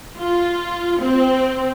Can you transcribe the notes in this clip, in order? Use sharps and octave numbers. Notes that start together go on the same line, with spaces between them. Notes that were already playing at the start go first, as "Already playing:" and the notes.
F4
C4